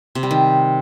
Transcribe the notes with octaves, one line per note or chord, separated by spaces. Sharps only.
C3
G3
D#3